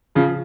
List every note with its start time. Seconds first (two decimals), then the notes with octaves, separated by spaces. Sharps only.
0.15 C#3 F3